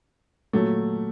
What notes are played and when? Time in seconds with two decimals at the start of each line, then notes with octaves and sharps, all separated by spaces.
0.53 A#2 F#3 A3